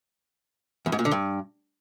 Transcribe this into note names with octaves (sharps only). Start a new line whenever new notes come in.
E2
G#2
A#2
D3
G2